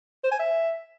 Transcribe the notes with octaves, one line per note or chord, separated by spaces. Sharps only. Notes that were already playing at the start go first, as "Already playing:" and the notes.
C5
G#5
E5